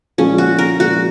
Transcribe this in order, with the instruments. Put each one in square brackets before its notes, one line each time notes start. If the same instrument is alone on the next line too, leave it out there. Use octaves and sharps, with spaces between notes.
[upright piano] A#2 F3 G#3 [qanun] C#4
[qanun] F#4
A#4
[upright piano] A#2 F3 G#3 [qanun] F#4